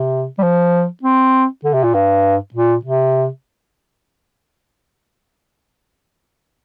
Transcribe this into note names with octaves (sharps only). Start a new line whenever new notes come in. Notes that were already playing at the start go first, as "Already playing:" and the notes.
Already playing: C3
G3
F3
C4
D3
C3
A#2
G2
A#2
C3